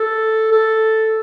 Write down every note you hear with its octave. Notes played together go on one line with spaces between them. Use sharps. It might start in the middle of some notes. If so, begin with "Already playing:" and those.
Already playing: A4
A4